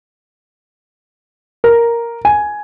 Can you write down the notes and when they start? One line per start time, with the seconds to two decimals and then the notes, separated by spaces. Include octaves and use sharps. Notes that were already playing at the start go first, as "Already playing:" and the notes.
1.64 A#4
2.25 G#5